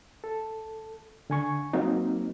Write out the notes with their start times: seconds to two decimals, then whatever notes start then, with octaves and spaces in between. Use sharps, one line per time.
0.24 A4
1.30 D3 G#5 C#6
1.73 F#3 A#3 C4 D#4